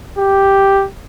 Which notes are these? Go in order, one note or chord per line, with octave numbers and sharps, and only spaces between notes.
G4